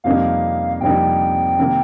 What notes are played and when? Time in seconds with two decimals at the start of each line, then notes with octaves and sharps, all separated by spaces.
0.04 F2 C3 G3 A#3 D#4 F5
0.81 F2 C3 G3 A#3 D#4 G5
1.58 C3 D#3 A#3